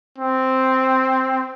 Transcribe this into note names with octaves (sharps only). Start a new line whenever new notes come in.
C4